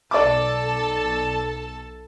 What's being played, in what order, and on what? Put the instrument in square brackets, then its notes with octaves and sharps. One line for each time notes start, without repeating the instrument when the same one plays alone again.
[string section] B1 A4 A5 [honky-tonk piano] D5 D6